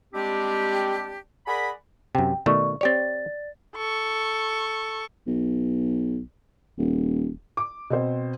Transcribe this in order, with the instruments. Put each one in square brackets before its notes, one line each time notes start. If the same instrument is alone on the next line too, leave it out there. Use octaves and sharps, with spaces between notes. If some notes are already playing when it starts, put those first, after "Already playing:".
[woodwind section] G3 G#3 C4 D4 G4
G#4 A#4 D5 F#5 B5
[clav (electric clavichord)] F#2 C3 [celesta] G5
[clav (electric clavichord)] B2 D#3 A3 [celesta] D5 C#6
[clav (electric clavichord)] C4 G4 C#5 [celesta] D5 A6
[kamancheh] A4 C#6
[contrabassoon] B1
D#1
[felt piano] D6
B2 C4 C5